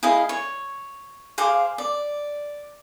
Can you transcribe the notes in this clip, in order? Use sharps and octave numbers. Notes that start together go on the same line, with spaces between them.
E4 G#4 D#5 F5
C#5
G#4 C5 F5 D6
D5